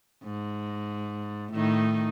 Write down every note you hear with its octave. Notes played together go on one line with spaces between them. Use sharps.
G#2
A2 D#3 D#4